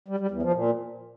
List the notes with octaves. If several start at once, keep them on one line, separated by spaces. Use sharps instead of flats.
G3
G3
E2
F3
A#2